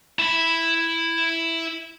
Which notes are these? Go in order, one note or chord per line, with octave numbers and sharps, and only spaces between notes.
E4 B5